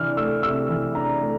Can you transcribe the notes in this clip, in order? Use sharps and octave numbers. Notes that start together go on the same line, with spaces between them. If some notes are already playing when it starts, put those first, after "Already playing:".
Already playing: C3 E3 D4 F6
A3 E6
C3 E6
E3
D4 A#5
A3